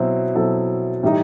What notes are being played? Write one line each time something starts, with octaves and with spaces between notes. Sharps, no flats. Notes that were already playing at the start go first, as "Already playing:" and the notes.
Already playing: B2 F#3 C4 E4
B2 F#3 C4 E4 A4
A2 E3 G3 D#4